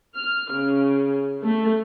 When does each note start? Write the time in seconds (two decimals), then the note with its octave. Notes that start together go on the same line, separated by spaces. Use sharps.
0.16 F6
0.52 C#3
1.44 A3